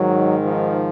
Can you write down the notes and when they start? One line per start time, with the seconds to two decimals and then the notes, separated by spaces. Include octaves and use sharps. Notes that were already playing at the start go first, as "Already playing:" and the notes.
Already playing: G#2 D#3 F#3
0.45 F3